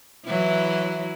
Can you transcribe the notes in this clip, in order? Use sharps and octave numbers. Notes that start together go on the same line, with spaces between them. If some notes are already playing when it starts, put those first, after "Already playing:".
E3 F#3 E4